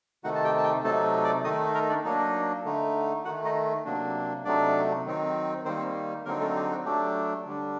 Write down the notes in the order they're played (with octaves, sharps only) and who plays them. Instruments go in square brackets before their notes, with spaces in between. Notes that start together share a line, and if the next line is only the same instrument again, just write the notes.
[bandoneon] C3 D#3 A3 D#4 F#4 F#5
A5
G4 G5
A5
G4 G5
C3 F#3 A3 D#4 A4 A5
D5 D6
D#3 A3 D#4 D#5 D#6
A#4 A#5
D4 D5
F#3 A#3 D4 D#4 D#5
D3 A3 D#4
D#3 A3 D#4 F#4 F#5
D#4 D#5
C3 F#3 A#3 D4
C3 F#3 A3 D4 D#4 D5
D#3 F#3 C4 D#4
D#3 G3 A#3 C4 D#4 C5
D3 F#3 A#3 C4 D#4 A#4
A3 A4
G4
F#4
F#3 A3 D4 G4
D3 G3 D4